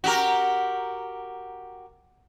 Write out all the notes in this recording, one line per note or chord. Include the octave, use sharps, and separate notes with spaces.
F#4 G4 A#4